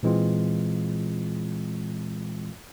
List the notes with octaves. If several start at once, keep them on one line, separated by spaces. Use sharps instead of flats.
A#2 E3 G#3 C4 F4